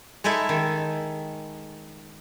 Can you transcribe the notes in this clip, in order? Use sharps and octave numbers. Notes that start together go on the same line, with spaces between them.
G#3 D#4 E4 A4 E5
D#3